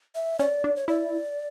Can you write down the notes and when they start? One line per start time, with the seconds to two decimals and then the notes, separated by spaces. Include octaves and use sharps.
0.15 E5
0.39 C#4 D5
0.64 D4
0.76 C#5
0.88 E4 D5